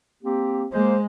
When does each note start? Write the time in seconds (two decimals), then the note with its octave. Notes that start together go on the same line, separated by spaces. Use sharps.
0.23 A#3 C4 G4
0.72 G#3 A#3 C5